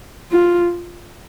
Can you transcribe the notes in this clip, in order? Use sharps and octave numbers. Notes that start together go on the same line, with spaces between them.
F4